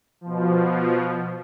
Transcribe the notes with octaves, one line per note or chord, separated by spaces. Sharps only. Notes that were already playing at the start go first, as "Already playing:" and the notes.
B2 F3